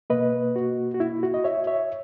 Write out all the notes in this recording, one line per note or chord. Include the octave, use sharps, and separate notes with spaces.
B2 A#3 B4 D#5
F#4
F#4
E4
F#4
D#5
C#5 E5
C#5 E5